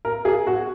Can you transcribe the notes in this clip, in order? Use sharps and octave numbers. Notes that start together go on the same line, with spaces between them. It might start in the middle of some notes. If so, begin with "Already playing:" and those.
A#4
G#4
F#4